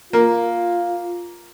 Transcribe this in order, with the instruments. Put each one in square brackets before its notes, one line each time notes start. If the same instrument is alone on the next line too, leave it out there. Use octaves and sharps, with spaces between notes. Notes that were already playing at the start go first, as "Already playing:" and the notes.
[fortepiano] A#3 [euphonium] F4